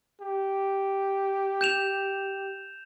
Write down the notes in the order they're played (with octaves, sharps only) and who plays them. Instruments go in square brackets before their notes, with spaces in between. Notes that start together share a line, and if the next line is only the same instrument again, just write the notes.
[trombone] G4
[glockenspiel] G6 E7 F7